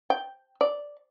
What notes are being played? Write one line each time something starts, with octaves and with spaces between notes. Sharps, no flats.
G5
D5